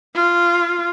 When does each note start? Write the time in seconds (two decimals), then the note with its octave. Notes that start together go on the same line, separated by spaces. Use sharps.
0.15 F4